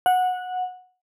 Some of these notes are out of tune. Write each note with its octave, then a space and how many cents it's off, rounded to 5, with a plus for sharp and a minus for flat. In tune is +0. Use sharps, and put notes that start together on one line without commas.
F#5 -15